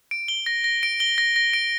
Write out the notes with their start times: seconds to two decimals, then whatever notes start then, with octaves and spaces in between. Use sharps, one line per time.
0.11 D7
0.28 G7
0.46 A#6
0.64 A#6
0.83 D7
1.00 G7
1.18 A#6
1.36 A#6
1.53 D7